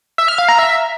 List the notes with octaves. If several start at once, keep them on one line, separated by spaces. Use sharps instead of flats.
E5
F6
F5
A#5
E5